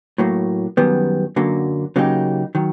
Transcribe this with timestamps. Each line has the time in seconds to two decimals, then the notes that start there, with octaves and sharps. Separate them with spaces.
0.18 A2 F#3 A#3
0.77 F#2 D#3 G3 B3
1.36 F#2 D3 F#3 A#3
1.96 C#3 F#3 A#3 D#4 G4
2.55 D#3 F#3